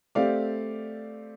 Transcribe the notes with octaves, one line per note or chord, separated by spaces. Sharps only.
A3 C4 G4 D5 F5